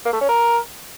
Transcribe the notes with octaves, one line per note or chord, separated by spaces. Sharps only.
A#3
A3
C#4
A#4